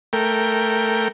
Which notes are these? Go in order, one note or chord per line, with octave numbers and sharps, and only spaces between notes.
A3 A#4 G5